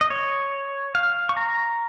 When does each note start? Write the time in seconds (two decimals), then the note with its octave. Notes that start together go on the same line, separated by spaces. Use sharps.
0.01 D#5
0.10 C#5
0.95 F5
1.29 C#6
1.37 A#5